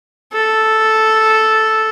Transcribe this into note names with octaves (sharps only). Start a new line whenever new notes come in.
A4